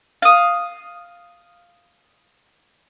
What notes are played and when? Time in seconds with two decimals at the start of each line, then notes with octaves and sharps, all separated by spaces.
0.22 F5 D#6